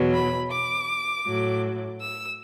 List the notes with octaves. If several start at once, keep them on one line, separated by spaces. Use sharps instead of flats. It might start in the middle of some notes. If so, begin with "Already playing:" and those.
Already playing: E2 B2 F#3
B5
D6
A2 F#3
E6